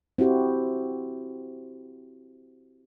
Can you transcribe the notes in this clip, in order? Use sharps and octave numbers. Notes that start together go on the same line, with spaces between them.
C4 E4 F#4 G4 C5